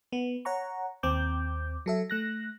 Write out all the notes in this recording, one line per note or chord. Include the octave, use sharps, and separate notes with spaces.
B3
C#5 F#5 A#5 C#6
D#2 C4 D6 G6
F#3 A4 E5
A3 F#6 A#6